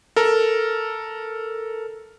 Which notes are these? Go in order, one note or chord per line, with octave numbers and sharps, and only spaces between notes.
A4 A#4